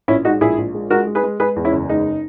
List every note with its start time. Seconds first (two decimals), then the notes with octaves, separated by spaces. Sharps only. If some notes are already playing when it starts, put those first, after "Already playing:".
0.08 A#1 C#4 E4
0.25 G#3 D#4 F#4
0.41 A#1 E4 G#4
0.58 A#1
0.74 G#3
0.90 G#3 F#4 A#4
1.07 G#3
1.15 G#4 B4
1.23 G#3
1.40 G#3 G#4 B4
1.56 E2
1.64 C#4 E4
1.73 F#1
1.89 G#3 D#4